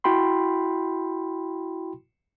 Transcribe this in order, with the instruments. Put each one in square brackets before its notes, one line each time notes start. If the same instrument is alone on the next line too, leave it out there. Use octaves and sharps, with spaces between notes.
[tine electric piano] E4 F#4 G5 B5 C6